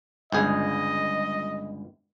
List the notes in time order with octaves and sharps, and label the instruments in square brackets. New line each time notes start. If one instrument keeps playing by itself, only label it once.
[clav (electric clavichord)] G1 C#2 G#4 [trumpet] D#5